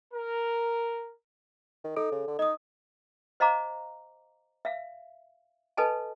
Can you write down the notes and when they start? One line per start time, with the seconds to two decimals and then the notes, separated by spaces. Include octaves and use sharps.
0.13 A#4
1.84 D#3
1.97 D#4 A4
2.12 C#3
2.28 D3
2.39 D#4 D#5 D#6
3.40 C5 D#5 F5 A#5 D6
4.65 E5 F5
5.77 A4 B4 D#5 G#5 A5